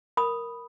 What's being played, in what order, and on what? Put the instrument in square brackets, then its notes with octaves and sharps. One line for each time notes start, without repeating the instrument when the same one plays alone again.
[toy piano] A#4 B5 D#6